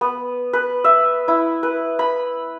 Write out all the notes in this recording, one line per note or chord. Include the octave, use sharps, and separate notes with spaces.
B3
B4
E5
E4
B4
B5